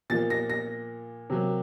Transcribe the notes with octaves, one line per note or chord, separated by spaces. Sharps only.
A#2 F3 A#3 A6
A#6
A#6
C3 F#3 A#3